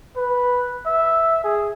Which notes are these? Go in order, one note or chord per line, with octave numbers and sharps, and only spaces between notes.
B4
E5
G#4